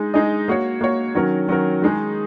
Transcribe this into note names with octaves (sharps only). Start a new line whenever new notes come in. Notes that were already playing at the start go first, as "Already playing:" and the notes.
Already playing: G#3 D#4 G#4
G#3 D#4 G#4 D#5
A#3 F#4 C#5
A#3 F#4 C#5
D#3 F#3 C#4 F#4 A#4
D#3 F#3 C#4 F#4 A#4
D#3 G#3 D#4 G#4